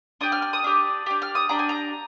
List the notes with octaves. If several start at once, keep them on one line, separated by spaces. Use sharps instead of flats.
D4 G4 D#6
F6
F6
D#6
D4 G4
D4 G4
F6
D#6
D4 G4 A#5
G#5
A#5